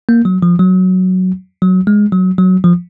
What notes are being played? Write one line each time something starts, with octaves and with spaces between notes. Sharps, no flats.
A#3
F#3
F3
F#3
F#3
G#3
F#3
F#3
F3